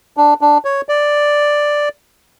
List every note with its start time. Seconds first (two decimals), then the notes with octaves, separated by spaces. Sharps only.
0.17 D4
0.41 D4
0.65 C#5
0.89 D5